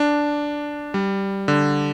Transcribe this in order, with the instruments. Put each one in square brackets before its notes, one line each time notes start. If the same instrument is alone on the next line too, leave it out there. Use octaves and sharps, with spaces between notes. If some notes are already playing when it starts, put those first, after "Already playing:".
Already playing: [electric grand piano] D4
G3
D3